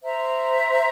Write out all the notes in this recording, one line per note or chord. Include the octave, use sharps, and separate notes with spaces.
C5 E5 A#5